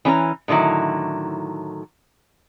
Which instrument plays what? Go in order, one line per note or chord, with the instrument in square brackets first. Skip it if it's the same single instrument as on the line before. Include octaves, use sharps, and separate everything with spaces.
[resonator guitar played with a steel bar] E3 C#4 G4 A#5
A2 D3 D#3 F#3 E4